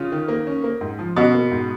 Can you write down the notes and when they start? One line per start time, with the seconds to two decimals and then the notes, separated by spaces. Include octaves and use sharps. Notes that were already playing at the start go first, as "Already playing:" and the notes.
Already playing: C#3 F4
0.12 D#3
0.28 A#3
0.47 C#4
0.64 A#3
0.81 G#2
0.99 F3
1.17 B2 C#4
1.34 A#3
1.51 G#2